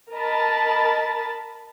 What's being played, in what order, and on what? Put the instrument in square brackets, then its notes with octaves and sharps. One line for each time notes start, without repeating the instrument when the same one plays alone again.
[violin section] A#4 D#5 A5 B5 A6